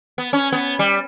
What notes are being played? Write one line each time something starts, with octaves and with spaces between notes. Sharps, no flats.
B3
C#4
B3
G3